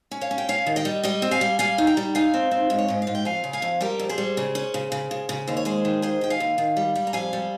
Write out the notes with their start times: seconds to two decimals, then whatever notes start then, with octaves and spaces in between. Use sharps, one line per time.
0.11 C#4
0.21 C#5 F5
0.31 C#4
0.38 G5
0.49 C#4 C#5 F5
0.67 D#3
0.76 D#5 G5
0.85 G3
1.03 G3 D#5 G5
1.22 C4
1.31 F5 G#5
1.41 G3
1.59 G3 F5 G#5
1.78 D#4
1.87 G5 A#5
1.97 G3
2.15 D#4 F5 G#5
2.34 C4
2.51 C4
2.70 G#2
2.78 C#5
2.88 G#2 D#5
3.02 F5
3.07 G#2
3.15 G5
3.25 F2 F5 G#5
3.44 C#3
3.53 F5 G#5
3.62 F2
3.81 G3 G4 A#4
4.00 F2
4.09 G#4 C5
4.18 G3
4.37 C#3
4.55 C#4
4.74 C#3
4.92 C#3
5.11 C#3
5.29 C#3
5.48 D#2 C5
5.57 C#5
5.65 G#3 G#4 C5
5.85 D#3
6.02 D#2 G#4 C5
6.21 D#3 G5
6.30 F5 G#5
6.40 D#2
6.58 D#3
6.77 G3
6.95 G3
7.07 A#5
7.13 F2 F5 G#5
7.33 G3